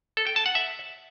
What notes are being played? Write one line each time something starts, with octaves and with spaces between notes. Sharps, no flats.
A4
G5
A5
F#5
E5